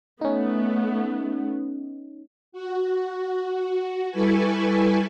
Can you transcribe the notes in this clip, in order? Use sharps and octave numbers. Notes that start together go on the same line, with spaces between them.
A3 B3 C#4 D#4
F#4
G3 E4 A4 B4 G#5 C#6